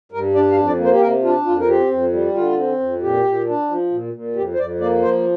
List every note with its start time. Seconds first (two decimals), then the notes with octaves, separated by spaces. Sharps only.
0.12 G2 A#4
0.34 D4 D5
0.51 F5
0.56 F2
0.67 D5
0.79 A#3
0.84 C5
0.93 G4
1.01 C3 A#4
1.23 D4 F4
1.46 F2 F4
1.59 A#4
1.68 C4 G4
1.90 F2
2.12 G3
2.35 D3 F4
2.57 C4
2.80 F2
3.02 A#2 G4
3.24 A#2
3.46 D4
3.69 F3
3.91 A#2
4.13 A#2
4.36 F2 G4
4.54 C5
4.58 F2 D5
4.80 A#3 D5
5.03 F3 C5